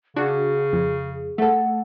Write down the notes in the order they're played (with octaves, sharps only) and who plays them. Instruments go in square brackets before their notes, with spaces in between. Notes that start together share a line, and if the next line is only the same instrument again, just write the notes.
[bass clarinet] C#3 [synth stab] D4 F#4 [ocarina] G#4
[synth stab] F2
[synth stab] A3 A4 [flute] F#5